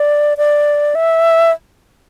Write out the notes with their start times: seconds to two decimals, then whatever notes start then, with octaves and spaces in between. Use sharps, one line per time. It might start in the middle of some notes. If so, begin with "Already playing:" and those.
Already playing: D5
0.38 D5
0.95 E5